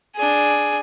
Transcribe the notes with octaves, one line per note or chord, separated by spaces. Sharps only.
D4 G#4